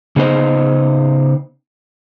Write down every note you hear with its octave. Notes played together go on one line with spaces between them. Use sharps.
C#3 B3 D#4 C5 D#5